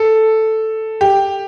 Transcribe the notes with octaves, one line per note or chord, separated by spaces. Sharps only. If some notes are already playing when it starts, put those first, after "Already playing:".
Already playing: A4
G4